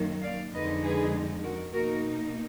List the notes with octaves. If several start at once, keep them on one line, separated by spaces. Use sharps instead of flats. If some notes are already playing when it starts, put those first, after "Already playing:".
Already playing: F#2 D#3 F#3 A#3
D5 F5
F2 D3 G#3 D#4 B4 D#5
G#4 B4
F#4 A#4
B2 A#3 D#4 F#4 A#4